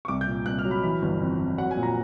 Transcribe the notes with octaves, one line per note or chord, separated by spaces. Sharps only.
C#6
C2 D6
G6
A#2
C2 F#6
F6
F#3
B5
E3 B5
G1
F2
F2
F#3 F#5
G#5
A#2
A#5